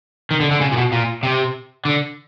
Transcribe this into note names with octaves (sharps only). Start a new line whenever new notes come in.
D#3
D3
D3
C#3
A#2
B2
A#2
C3
D3